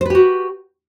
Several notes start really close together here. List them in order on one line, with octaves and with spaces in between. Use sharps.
C5 B4 G4 F#4